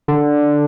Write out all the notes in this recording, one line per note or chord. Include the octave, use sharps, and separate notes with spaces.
D3